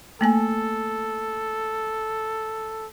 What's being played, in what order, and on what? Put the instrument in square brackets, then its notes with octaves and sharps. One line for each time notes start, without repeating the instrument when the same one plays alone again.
[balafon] A3 A#3 G#5 [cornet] A4